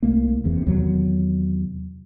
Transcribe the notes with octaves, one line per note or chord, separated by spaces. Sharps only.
C2 A3 A#3
F1 E2 C3
E2 C3 D#3 F#3